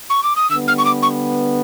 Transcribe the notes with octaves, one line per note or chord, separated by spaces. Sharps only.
C#6
D6
D#6
D3 G3 B3 E6
F6
C#6
D6
C#6